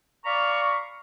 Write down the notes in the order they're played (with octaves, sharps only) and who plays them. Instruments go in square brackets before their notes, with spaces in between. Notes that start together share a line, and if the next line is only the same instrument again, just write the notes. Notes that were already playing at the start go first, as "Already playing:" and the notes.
[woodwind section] D5 F5 A#5 B5 C#6